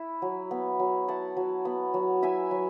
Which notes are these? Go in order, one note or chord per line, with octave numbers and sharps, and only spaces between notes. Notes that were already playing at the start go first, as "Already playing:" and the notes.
Already playing: E4
F#3
B3
F#3
E4 F#5 A5
F#3
B3
F#3
E4 E5 G#5
F#3